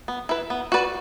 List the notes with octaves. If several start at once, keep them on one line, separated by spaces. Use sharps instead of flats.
B3
E4 B4
B3
F#4 B4 D5